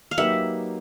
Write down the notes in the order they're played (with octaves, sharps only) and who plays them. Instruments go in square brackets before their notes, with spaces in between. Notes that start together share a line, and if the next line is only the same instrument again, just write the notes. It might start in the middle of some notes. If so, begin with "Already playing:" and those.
[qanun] F5
[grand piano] F#3 A#3 D#4 G4 B4 [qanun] E5 F#5